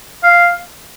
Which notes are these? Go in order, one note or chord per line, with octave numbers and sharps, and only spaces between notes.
F5